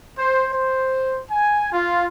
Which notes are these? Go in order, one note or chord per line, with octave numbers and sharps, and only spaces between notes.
C5
C5
G#5
F4